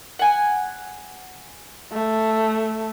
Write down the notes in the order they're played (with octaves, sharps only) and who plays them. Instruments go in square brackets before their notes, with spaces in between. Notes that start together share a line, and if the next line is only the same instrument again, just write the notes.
[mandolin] F#5 G#5
[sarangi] A3